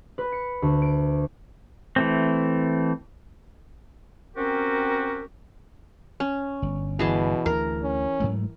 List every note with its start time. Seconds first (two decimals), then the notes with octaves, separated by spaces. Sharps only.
0.18 B4
0.32 C#7
0.62 D2
0.82 D7
1.96 E3 A3 C4
4.36 C4 C#4 F#4 G4 A#4
6.20 C#4
6.62 G1
6.99 B2 E3 G#4 A5
7.46 D2 A#4
7.83 C#4
8.20 G#2 F#3 A3